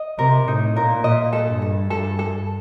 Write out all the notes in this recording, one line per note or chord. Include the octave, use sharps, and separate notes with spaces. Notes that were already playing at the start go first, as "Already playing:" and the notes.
Already playing: D#5
C3 A#4
A2 D#4
A#2 A#4
A#2 D#5
A4
G2
A4
G2 A4
A4